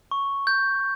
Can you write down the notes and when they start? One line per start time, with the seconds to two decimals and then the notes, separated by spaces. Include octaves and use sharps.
0.11 C#6
0.47 G6